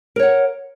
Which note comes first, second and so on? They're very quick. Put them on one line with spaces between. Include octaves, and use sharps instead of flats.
A#4 C#5 F#5